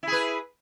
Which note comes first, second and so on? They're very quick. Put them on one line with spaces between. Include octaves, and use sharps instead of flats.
E4 G#4 B4